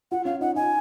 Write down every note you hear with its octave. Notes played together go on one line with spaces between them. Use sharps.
F4 F#5
C#4 F5
D#4 F#5
D#4 G#5